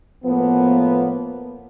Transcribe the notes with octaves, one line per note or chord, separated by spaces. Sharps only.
A2 F3 A#3 B3